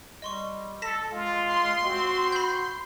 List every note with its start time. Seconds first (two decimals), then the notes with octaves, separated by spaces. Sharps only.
0.22 G3 D#5 C6 C#6
0.82 A4 A#6 B6 E7
1.12 G#3 F4
1.50 C6
1.85 C4 F#4
2.32 B5 G6